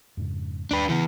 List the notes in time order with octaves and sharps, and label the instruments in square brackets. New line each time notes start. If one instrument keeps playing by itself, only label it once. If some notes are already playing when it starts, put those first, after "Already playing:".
[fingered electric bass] F2 G#2 C#3
[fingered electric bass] D#2 [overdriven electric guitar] D4 B4
[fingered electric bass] C#3 [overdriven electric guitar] E3 B3